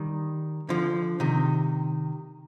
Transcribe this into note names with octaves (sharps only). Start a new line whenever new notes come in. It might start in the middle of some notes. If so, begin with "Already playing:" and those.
Already playing: D#3 G3
D3 F3
C3 D#3